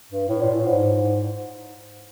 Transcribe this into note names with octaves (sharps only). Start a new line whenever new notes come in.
G2
A2
A#2
A2
G#2